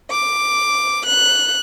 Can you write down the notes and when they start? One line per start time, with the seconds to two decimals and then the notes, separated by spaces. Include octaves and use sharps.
0.10 D6
1.05 F#6